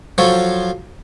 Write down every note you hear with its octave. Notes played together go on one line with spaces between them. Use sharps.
F3 F#3 A4 C#5